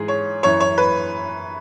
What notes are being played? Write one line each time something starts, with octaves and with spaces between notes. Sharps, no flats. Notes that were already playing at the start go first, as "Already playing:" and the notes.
Already playing: G#2 E3 G#4
C#5
F#2 E3 C#5
C#5
B4